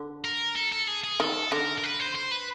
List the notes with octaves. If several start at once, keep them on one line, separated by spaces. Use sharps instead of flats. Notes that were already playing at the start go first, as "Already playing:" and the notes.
Already playing: D3
A#4
A4
A4
G#4
G#4
D#3 A4
D3 A#4
A#4
B4
C5
C5
B4